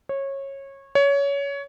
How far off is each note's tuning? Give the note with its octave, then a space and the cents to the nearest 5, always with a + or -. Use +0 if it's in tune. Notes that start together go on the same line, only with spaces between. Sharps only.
C#5 -20
C#5 +20